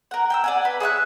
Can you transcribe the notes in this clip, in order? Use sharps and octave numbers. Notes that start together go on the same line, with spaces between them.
A#4 F#5
G5 G#5 E6
D5 F#5 G#5
B4
G#4 C#5 E5 F#6